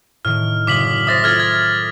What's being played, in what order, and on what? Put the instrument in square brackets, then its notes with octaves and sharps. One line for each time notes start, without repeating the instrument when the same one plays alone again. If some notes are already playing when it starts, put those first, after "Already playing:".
[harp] A2 D#3 [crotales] F6
[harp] F#1 D#6 [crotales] D6 B6 F#7
[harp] C5 E5 [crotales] D#6 A6 A#6
[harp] F4 A4 [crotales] F6 G#6 A6
[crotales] G#6